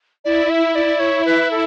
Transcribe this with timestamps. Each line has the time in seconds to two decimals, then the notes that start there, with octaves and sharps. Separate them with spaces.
0.24 E4 D5
0.50 E5
0.75 D5
0.99 C#5
1.26 B4
1.51 A4